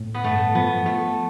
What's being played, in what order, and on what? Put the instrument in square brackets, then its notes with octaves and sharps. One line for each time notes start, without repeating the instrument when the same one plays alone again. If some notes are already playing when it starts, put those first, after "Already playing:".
Already playing: [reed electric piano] A2
[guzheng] B3
[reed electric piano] G2 [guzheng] A3
[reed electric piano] F3 [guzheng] B3
[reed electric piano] F3 [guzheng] A3